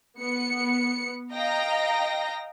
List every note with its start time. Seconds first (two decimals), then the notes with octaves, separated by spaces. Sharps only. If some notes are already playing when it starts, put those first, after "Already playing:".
0.18 B3 C#7
1.33 D#5 F5 G5 A#5 A#6